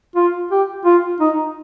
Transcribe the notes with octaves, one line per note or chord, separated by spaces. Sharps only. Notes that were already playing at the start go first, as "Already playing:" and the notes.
F4
G4
F4
D#4